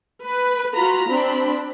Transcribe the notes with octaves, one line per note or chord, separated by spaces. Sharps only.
B4
F4 F#4 A#5 B5
C4 D4 B5